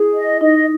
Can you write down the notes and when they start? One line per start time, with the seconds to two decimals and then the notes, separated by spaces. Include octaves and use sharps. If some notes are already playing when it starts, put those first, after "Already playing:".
Already playing: E4 G#4
0.14 D#5
0.41 D#4 D#5